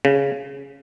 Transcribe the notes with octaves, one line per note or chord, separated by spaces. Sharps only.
C#3